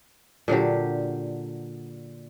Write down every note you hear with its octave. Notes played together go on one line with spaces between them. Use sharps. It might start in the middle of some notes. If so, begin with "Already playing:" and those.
A#2 D3 F#3 G4